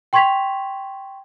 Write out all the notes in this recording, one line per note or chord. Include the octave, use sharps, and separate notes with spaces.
G5 C6 C#6 G#6 B6 F7